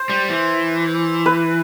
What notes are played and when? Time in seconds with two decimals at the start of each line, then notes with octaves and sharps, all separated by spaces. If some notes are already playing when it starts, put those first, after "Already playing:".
Already playing: C5
0.09 G3
0.29 E3
1.26 B4